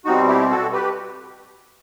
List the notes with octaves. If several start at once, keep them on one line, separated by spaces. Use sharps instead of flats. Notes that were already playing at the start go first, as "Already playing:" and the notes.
B2 G3 C4 D#4 F#4
E4 G4
F#4 A4
G4 B4